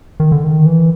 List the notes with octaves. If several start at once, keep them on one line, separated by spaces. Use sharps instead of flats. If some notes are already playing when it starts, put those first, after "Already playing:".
D#3
D3
D#3
E3